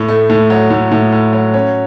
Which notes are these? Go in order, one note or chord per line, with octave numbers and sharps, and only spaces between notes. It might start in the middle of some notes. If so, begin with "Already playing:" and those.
Already playing: A2
A3
A2
F#3
A2
A2
A2
F#3
C#4